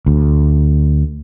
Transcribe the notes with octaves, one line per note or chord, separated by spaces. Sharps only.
D2